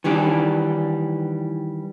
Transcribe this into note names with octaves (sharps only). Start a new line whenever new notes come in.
D#3 E3 G3 D4